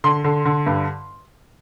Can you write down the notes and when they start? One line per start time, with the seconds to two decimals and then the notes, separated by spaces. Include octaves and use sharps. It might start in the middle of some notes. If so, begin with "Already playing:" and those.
0.04 D3 C6
0.24 D3
0.45 D3
0.67 G2